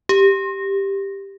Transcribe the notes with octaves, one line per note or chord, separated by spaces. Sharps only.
G4